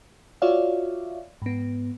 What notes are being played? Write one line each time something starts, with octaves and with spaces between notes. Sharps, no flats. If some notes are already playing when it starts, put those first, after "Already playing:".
F4 F#4 C#5 D5 E5 F5
G#2 B3